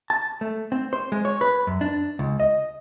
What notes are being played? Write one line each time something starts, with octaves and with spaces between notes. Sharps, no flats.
A5
A3
C4
C5
G#3
C#5
B4
F#2
D4
C#2
D#5